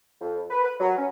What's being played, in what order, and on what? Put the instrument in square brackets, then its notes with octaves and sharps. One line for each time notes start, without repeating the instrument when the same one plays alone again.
[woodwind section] F2
B4
B4
F#3
C#4